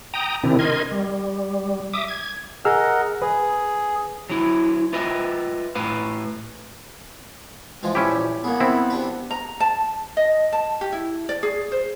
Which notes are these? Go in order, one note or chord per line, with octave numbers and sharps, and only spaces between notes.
G5 A#5 D#6
C3 D#3 C4 D4 E4
A#4 D#5 C6 G#6
G3
E5 D6 D#6
G#6
G#4 A#4 D#5 F#5 E6 F6
G#4 B4
F#3 E4
F4 B4 D#5 E5
A2 B4 F5
E3 F3 G#3 F4
A#2 C#4 E4 G4
A#3 B3 G#4
C4 E4
C3 D4 B4
A#5
A5
D#5
A5
G4
E4
D5
G#4
C5